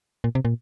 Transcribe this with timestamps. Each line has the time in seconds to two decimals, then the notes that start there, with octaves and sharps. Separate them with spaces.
0.24 A#2
0.35 C3
0.45 A#2